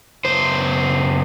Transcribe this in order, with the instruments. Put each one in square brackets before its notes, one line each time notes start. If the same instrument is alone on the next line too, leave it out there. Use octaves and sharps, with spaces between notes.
[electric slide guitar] F#2 C#3 B3 C5